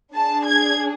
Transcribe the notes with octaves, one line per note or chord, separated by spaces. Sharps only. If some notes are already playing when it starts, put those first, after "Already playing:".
D4 G#4 A5
G#6